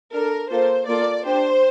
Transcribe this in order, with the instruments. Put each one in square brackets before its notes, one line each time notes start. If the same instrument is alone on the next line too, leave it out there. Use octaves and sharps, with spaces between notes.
[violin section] D4 A4 A#4
A#3 F4 A4 C5
A#3 F4 A4 D5
D4 G4 C5